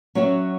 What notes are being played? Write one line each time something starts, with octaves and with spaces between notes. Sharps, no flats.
F#3 C#4 F#4 C#5 E5